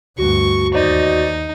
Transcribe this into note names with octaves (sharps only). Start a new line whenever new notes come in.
D2 G2 F#4 C#6
D#2 D#4 C5 D5 D#5